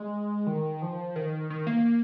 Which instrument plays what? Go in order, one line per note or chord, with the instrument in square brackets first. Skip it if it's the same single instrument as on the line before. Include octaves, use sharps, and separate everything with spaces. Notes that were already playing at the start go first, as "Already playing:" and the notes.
Already playing: [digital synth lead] G#3
D#3
F3
D#3
D#3
A#3